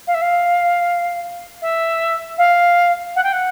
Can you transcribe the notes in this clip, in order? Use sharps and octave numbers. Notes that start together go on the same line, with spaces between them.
F5
E5
F5
E5
F5
F#5
G5
F#5